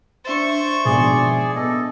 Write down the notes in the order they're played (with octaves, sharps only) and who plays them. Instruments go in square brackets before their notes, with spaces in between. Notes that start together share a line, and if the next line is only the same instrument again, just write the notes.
[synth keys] D4 E5 A6 [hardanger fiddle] C5 C#6
[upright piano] G#1 B2 F3 [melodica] G#4 D5
[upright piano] B3 [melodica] A4 D#5